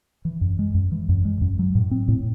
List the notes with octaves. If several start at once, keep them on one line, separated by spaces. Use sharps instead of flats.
E3
F#2
G#3
F#2
E3
F#2
G#3
F#2
F#3
A2
C4
A2